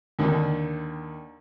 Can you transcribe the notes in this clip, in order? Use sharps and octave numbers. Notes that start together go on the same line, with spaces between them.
D#2 D3 D#3